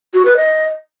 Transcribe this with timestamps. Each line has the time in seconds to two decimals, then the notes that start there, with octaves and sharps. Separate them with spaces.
0.14 F#4
0.25 B4
0.37 D#5